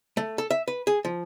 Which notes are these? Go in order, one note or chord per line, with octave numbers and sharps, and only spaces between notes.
A3
A4
E5
B4
G#4
F3